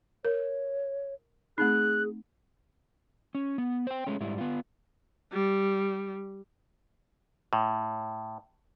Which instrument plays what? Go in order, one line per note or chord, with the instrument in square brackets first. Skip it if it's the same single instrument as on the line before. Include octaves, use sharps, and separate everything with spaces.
[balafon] A#4 [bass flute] C#5
[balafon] A3 C4 D#4 [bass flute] G#4 [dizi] F#6
[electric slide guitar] C#4
B3
C5 G5
G#3 A3 C#4
G#2 G3 E4
B3 F4
[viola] G3
[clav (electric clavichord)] A2